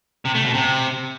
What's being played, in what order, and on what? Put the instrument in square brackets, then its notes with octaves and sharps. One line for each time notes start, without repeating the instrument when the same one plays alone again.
[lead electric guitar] C3
A3
B2
C3